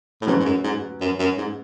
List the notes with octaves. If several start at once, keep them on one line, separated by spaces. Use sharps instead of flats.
A2
G#2 F#3 C#4 F#4 B4
G#2
F#2
G#2
F#2
F#2
G#2